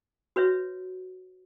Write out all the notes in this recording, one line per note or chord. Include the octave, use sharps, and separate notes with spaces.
F#4 B4 C#5 E5